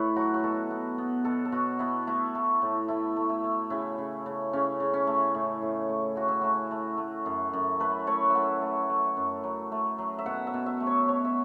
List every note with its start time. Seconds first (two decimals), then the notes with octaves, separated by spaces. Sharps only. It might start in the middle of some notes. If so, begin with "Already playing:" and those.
Already playing: A2 A4 B4 C#5 E5
0.16 F#3 F#4
0.34 F#4
0.43 B2 A4
0.71 B3
0.98 B3
1.24 B2 A4
1.45 A4
1.52 B2 F#4
1.79 B3 E4
2.07 A3 E4
2.35 A3
2.62 A2
2.88 A3 E4
3.16 A3
3.29 E4
3.44 A3
3.70 C#3 E4
3.98 C#3
4.26 C#3
4.53 C#3 C#4
4.80 C#3
4.93 C#4
5.07 A3
5.34 A2
5.62 A2
5.89 A3
6.16 A2 F#4
6.28 E4
6.41 A3 F#4
6.71 A3
6.98 A3
7.26 F#2
7.53 F#2
7.80 A3 B4
8.07 A3 C#5
8.30 E5
8.35 A3 F#5
8.61 A3
8.89 A3
9.17 F#2
9.44 F#3
9.72 A3
9.98 F#3
10.19 E5
10.26 B2 F#5
10.47 E5
10.54 B2
10.66 E5
10.80 A3
10.87 C#5
11.08 B2 C#5
11.25 E5